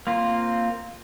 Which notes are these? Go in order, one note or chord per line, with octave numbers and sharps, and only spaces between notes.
A#3 C4 F4